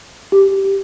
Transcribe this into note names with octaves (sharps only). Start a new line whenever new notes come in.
G4